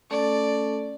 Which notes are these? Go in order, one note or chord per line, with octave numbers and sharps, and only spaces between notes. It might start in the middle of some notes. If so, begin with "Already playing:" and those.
A3 C#4 A4 D5